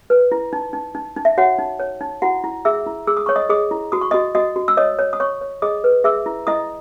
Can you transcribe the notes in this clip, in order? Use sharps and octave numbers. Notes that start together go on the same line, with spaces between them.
B4
E4
D#4
D#4
D#4
D#4
E5
F#4 C#5 F#5
D#4
C#5
D#4
E4 F#4 F#5
E4
G#4 E5 E6
E4
G#4 E6
D#6
C#5 C#6
D#5 D#6
G#4 D#5 D#6
E4
F#4 D#6
C#6
F#4 D#5 D#6
F#4 D#5 D#6
F#4
E6
C#5 D#5 D#6
C#5
D#6
C#5 C#6
C#5
G#4 D#5 D#6
B4
G#4 E5 E6
E4
E4 D#5 D#6